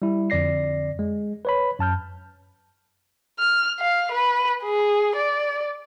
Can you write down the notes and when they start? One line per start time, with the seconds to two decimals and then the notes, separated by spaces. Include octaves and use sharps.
0.02 G3 E4
0.30 F2 D3 D5 A#6 C7
0.99 G#3
1.45 B4 C#5 B5
1.79 F#2 A5 F6 G6
3.39 F6
3.80 F5
4.12 B4
4.63 G#4
5.16 D5